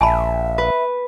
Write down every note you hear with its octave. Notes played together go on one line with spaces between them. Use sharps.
A#1 E5 G#5 A5 B5
B4